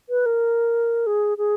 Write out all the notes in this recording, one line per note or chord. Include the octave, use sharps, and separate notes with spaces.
B4
A#4
G#4
G#4